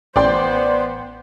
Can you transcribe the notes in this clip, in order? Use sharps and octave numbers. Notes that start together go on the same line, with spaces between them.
A1 B3 C5 D5 G5 C6